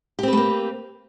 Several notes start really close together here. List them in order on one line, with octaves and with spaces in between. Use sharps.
G4 C4 B4 A3 A#3